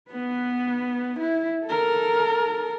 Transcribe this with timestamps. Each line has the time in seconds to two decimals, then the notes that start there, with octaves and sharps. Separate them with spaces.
0.11 B3 B4
1.20 E4
1.66 A4 A#4